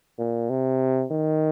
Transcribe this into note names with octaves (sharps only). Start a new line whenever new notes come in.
A#2
C3
D#3